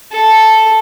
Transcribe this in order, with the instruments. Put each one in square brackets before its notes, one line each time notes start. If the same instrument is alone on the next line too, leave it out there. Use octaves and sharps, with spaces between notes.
[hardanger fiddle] A4